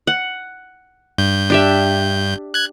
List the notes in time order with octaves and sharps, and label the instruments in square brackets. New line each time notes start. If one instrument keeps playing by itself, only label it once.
[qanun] F#5
[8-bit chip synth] G2 G6
[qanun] D4 G4 E5
[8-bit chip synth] F#6 G#6